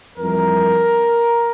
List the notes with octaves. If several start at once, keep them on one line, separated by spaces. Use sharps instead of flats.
F2 E3 G3 A#4